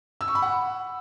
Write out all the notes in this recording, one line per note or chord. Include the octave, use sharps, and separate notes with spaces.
E6
C#6
B5
F#5